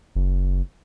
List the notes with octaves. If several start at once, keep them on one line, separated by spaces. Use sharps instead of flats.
F#1